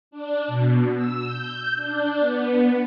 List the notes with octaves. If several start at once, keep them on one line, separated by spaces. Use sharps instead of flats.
D4
B2
E6
G6
D4
B3